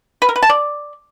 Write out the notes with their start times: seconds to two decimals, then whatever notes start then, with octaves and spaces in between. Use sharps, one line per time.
0.22 B4
0.29 A#4
0.36 B4
0.43 A5
0.49 D5